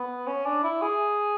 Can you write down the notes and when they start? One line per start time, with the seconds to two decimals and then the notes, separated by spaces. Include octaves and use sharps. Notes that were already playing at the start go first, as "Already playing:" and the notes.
Already playing: B3
0.27 C#4
0.46 D4
0.64 E4
0.82 G#4